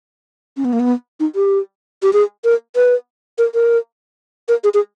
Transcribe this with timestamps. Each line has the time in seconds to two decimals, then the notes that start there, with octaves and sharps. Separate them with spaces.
0.57 C#4
0.65 B3
0.73 A#3
0.80 B3
1.20 D#4
1.35 G4
2.03 G4
2.13 G#4
2.44 A#4
2.76 B4
3.38 A#4
3.54 A#4
4.48 A#4
4.64 G#4
4.74 G#4